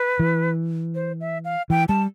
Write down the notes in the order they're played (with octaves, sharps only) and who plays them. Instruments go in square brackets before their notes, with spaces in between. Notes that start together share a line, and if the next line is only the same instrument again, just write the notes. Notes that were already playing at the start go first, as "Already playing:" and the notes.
Already playing: [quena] B4
[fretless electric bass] E3
[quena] C5
E5
F5
[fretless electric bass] E3 [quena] G5
[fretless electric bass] G3 [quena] A5